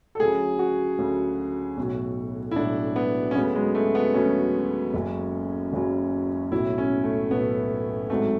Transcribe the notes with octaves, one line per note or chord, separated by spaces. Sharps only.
A4
D2 C#3 F#3 G#4
F#4
D2 C#3 F#3
B1 A2 F#3
E4
B1 A2 F#3 D4
B3
C#4
D2 C#3 F#3 B3
G#3
A3
B3
D2 C#3 F#3 C#4
F#1 F#2 C#3 F#3
F#1 F#2 C#3 F#3
B1 A2 F#3 E4
C#4
A3
B1 A2 F#3 B3
G#1 G#2 F#3 A3